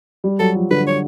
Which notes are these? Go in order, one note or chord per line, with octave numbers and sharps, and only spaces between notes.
G3
F#3 A4
F3
D3 B4
C#5